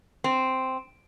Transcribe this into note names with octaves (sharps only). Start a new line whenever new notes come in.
C4